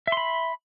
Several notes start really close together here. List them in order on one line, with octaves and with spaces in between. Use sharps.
E5 C6 B5